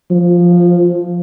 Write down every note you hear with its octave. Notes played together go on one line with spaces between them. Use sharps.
F3